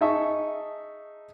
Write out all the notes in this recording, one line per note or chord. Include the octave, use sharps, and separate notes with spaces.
D#4 G#4 D#5 E5 A5 C#6